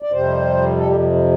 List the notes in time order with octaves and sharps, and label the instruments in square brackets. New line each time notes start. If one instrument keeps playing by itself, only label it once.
[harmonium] D5
F2 C3 G3 C5
A4
G4
G3
G3